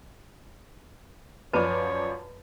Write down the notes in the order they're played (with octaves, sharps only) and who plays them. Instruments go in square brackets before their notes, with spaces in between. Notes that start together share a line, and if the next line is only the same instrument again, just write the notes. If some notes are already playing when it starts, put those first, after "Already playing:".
[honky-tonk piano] F#2 F3 D5 [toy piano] B4 A5 B5 [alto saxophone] C#5